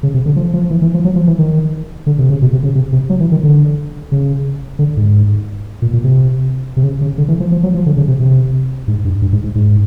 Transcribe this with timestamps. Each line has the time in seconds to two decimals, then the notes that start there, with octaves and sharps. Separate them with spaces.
0.03 C#3
0.14 C3
0.26 D3
0.36 F3
0.53 F3
0.70 E3
0.82 E3
0.94 F3
1.04 F#3
1.16 F3
1.27 E3
1.39 D#3
2.07 D3
2.19 C3
2.30 C#3
2.42 B2
2.53 C3
2.63 C#3
2.75 C3
2.92 C3
3.10 F#3
3.20 E3
3.31 D#3
3.43 D3
4.12 C#3
4.79 D3
4.97 G#2
5.82 A#2
5.93 A#2
6.04 C3
6.77 C3
6.83 C#3
7.01 C#3
7.18 D3
7.28 E3
7.40 F3
7.52 F3
7.63 F#3
7.75 F3
7.86 D3
7.97 C#3
8.08 C3
8.20 C3
8.88 G#2
9.05 G2
9.22 G2
9.33 G#2
9.44 G#2
9.55 G#2